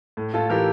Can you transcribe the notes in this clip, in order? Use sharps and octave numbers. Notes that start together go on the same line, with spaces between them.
A2
A2 F4 A4
E3 G4 A#4